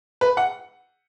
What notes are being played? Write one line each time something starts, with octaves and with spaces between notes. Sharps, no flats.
B4
F#5